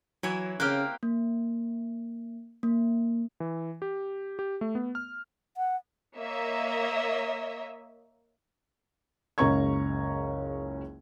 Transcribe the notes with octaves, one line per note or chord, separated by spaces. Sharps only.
E3 F#3 E4 C#5
C#3 A#3 C4 G4 F6 F#6
A#3
A#3
E3
G4
G4
A3
B3
F6
F#5
A#3 C#5 D#5 E5
F#1 C#2 C#4 A#5 C#6 G#6